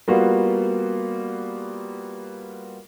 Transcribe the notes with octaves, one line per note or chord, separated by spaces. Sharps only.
G3 A#3 B3 F4 F#4